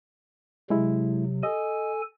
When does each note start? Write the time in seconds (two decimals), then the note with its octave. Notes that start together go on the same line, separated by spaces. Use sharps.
0.70 C3 F#3 G#3 E4
1.43 A4 D#5 G#5